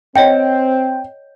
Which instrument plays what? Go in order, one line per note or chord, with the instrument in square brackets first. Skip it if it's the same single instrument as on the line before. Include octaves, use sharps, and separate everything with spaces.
[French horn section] C4 [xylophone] C#5 D#5 F#5 [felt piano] G5